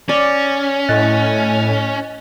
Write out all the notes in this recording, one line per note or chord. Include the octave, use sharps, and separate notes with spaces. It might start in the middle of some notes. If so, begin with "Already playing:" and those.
C#4 D5
A2 D#5 F#6 A6